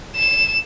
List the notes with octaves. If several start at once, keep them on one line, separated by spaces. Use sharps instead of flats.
E7